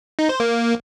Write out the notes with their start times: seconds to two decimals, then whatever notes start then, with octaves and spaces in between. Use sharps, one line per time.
0.19 D#4
0.29 C5
0.40 A#3